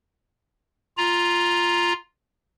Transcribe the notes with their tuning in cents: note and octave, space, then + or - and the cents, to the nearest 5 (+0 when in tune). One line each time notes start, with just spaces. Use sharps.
F4 +0 A#5 +10